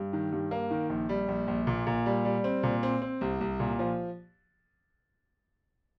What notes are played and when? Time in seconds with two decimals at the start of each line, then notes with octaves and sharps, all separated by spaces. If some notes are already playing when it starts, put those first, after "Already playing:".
Already playing: G2
0.13 D#3
0.32 G2
0.51 A#3
0.71 D#3
0.89 A#1
1.09 G3
1.28 A#1
1.48 A#1
1.67 A#2
1.87 A#2
2.06 G3
2.25 G3
2.44 C4
2.63 A#2
2.83 C4
3.02 C4
3.21 C2
3.41 C2
3.60 A#2
3.79 F3